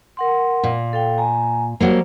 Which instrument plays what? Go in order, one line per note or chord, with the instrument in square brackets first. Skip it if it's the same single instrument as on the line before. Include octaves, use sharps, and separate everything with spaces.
[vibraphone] A#4 F#5 C6
[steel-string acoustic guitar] A#2
[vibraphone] A4 F5 G5
G#5 A#5
[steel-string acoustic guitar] F#3 G3 A#3 [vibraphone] C5